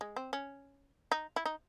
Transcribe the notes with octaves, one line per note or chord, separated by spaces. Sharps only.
G#3
C4
C#4
D#4
E4
D#4